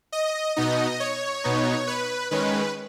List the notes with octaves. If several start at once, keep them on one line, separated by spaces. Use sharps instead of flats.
D#5
B2 B3 D#4 D#5
C#5
B2 B3 D#4
B4
D#3 G#3 C#4 B4